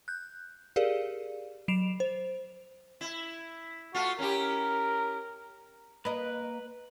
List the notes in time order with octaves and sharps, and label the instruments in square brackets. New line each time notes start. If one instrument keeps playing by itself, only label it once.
[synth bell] F#6 G6
G4 G#4 A#4 D5 F5
F#3 C7 D7 E7 F7
C5
[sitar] E4
[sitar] A3 F4 [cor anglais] F#4
[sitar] C#4 E4 G4 [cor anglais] A#4
[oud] A#3 D#5 [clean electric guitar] B4